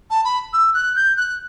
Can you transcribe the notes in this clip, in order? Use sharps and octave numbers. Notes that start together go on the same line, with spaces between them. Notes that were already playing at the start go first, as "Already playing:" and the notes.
A5
B5
E6
F#6
G6
F#6